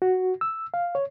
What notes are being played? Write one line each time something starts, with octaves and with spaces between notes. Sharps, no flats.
F#4
E6
F5
C#5